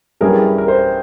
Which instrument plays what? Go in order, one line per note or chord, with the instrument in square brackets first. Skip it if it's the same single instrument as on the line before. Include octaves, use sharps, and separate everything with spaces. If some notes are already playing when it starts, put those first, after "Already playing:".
[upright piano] G2 G3 C#4 E4 G#4 [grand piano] A#4
[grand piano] A#4
C5